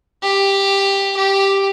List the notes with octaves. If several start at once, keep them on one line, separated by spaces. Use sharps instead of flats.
G4
G4